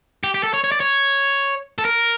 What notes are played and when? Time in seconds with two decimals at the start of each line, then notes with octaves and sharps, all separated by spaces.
0.24 G4
0.34 G4
0.43 A4
0.54 C#5
0.64 C#5
0.72 D5
0.80 C#5
1.78 A4
1.85 A#4